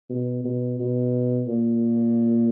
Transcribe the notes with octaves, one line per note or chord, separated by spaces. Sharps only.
B2
B2
B2
A#2